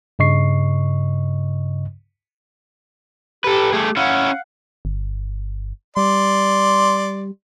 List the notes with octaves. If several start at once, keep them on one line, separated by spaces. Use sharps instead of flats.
G2 C#3 D#5 C#6 C7
G4 A4 B4
A3 G#4
C#4 E4 F5 F#5
G1
G3 D5 C6